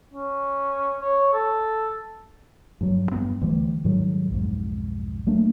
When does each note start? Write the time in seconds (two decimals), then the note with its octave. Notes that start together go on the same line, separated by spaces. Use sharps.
0.14 C#4
1.01 C#5
1.33 A4
2.81 G2 F#3
3.12 G2 B3 C4
3.42 D2 E3 G3 A3
3.85 G#2 D#3 F#3 G3
4.31 B1 F2 G#2
5.26 F#3 A3 A#3 D4